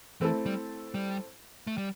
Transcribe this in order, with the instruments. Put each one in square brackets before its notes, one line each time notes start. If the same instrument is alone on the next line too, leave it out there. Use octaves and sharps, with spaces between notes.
[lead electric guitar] E3 [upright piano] A3 C4 E4 A4
[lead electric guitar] G3
G3
A3
G3